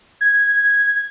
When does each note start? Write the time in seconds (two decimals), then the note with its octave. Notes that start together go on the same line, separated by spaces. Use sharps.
0.21 G#6